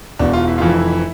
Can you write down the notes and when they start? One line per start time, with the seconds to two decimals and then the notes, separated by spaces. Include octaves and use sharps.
0.19 E1 E2 B2 D4
0.33 F4
0.48 E4
0.58 F1 F2 E3 F4
0.70 E4